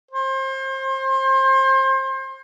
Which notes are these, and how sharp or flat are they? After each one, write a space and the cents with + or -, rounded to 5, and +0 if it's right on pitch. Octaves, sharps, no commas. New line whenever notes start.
C5 +30